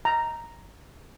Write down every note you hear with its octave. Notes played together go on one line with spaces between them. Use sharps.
A#5